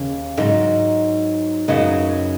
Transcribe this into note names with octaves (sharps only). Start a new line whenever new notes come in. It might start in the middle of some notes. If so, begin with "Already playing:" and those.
Already playing: D#2 C#3
G#2 F#3 D#4
F#2 C#3 F#3 B3 D#4